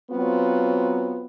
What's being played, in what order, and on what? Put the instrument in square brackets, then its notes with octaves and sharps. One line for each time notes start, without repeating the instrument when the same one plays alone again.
[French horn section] F#3 B3 C4 F4